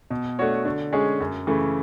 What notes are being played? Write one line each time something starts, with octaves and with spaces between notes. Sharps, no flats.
B2
A3 D4 F#4 C#5
D3
G#3 C#4 G#4
F#2
C#3 E3 A3